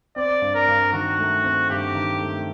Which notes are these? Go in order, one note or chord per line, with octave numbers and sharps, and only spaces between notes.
C4 D5
G2
A#4
G2
D#3 F#4
A3
C4
G2 G4
D#3
A3